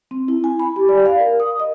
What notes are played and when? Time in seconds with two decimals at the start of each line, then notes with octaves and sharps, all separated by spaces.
0.11 C4
0.28 E4
0.44 G#5
0.59 B5
0.76 G4
0.89 D5
1.06 F5
1.20 A#4
1.40 D#6
1.60 D#5